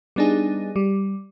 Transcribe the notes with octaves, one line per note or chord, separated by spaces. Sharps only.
G3 B3 D4 D#4 G#4
G3